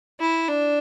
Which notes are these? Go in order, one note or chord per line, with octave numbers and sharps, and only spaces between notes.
E4
D4